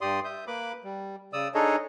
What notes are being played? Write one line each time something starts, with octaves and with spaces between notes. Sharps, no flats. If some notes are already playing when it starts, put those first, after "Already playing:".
G2 G4 D5 C6 D#6
E5 D#6 G6
A#3 B4 B5 D6
G3
C#3 D5 D#6 E6
D4 D#4 G#4 A4 C#5 D#5